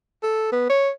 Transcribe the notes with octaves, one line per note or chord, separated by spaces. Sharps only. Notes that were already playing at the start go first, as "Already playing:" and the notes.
A4
B3
C#5